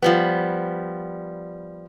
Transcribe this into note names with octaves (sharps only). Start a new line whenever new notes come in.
F3 G3 B3